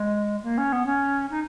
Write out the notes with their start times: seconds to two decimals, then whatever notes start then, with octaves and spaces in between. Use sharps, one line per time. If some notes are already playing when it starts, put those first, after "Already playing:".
Already playing: G#3
0.43 A#3
0.57 C#4
0.72 B3
0.86 C#4
1.30 D#4